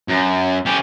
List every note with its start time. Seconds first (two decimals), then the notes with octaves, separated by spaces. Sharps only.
0.08 F#2
0.66 C#4 G4